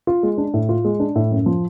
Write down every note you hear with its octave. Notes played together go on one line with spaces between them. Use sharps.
F4
G#3
D4
A2
F4
G#3
D4
A2
F#2
F3